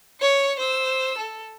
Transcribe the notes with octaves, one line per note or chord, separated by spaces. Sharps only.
C#5 C#7
C5 E6
A4